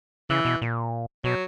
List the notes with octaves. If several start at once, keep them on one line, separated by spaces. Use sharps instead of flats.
C#3 E3
B2
A#2
B2 F#3